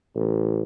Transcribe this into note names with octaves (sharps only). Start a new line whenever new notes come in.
A1